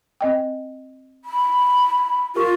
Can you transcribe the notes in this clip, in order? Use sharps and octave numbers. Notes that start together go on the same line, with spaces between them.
C4 D#5 G5
B5
F4 G4 A#4 C#6